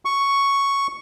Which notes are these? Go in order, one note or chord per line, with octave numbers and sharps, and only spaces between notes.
C#6